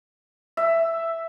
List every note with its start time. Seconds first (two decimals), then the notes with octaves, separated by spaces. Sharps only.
0.57 E5